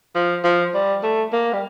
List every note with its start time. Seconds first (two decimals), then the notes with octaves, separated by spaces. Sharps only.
0.15 F3
0.44 F3
0.74 G3
1.03 A3
1.33 A#3
1.53 G3